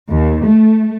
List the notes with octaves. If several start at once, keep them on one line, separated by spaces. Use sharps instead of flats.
D#2
A3